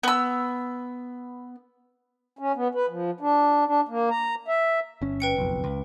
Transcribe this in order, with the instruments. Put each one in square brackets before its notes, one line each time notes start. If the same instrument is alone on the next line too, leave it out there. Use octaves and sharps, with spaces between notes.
[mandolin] B3 E6
[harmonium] C#4
B3
B4
F3
D4
D4
A#3
A#5
E5
[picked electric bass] G1 C#4
[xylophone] B4 G5 C#7
[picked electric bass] F#1 B1 F2
C#2